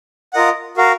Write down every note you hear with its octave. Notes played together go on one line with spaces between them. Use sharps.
F4 A#4 D#5 F#5
F#4 A#4 F5